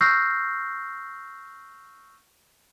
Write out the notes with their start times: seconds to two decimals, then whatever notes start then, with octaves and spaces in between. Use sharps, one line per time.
0.01 C#6 E6 F6 G6 A#6 C7